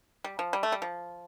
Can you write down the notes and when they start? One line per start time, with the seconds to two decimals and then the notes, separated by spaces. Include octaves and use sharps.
0.24 G3
0.39 F3
0.53 G3
0.63 A3
0.72 G3
0.82 F3